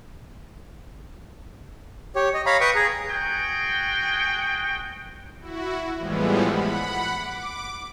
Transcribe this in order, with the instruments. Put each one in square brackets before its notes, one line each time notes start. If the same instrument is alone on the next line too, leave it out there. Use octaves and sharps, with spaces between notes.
[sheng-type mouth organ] G4 C#5
D#5
C#5 F5 A#5 B5
B4 G5 C#6 D#6
G#4 A#5
[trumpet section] F#4 G#4 G5
[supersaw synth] E4 F#4
A2 E3 F3 G3 G#3 B3
F#5 B5
D6